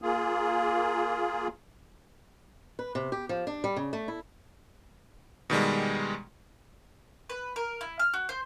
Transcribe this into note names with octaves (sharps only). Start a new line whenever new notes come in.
A#3 F4 G#4
B4
C3
G4
F3
D4
G3
C#3
A3
E4
B2 D#3 G3 G#3
B4
A#4
E4
F6
F#4
C5